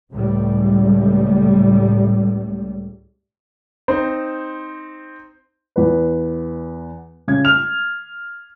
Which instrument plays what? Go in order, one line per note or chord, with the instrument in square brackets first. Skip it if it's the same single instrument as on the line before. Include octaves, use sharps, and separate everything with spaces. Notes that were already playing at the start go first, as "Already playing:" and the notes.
[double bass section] C#2 A2 G3
[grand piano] C4 D#4 C5
[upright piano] E2 B4
C#3 G#6
F6 F7